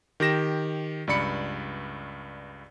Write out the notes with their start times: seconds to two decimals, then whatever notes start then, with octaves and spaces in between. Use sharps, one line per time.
0.20 D#3 G4 A#6 E7
1.07 C#2 G2 D5 B5 C#7